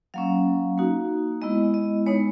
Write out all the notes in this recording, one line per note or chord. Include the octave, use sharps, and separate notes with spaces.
F#3 A#3 C#4 F5
A#3 D#4 F#4
G#3 B3 E4 D#5
D#5
G#3 B3 D#4 C#5